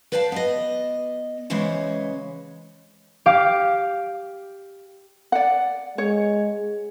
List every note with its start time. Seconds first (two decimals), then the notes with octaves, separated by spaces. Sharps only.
0.12 B4 C5 D5 F5 G5 A5
0.32 B3 D5 D#5
1.50 C#3 E3 G#3 C5 C#5
3.26 G4 F5 D6 G6
5.32 D5 F#5
5.98 G#3 C#5